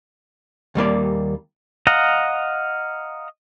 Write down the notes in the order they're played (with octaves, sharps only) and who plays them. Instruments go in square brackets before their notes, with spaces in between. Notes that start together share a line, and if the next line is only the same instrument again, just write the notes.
[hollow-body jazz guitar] D#2 G3 A#3 D5
[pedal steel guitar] D#5 F5 F#5 A#5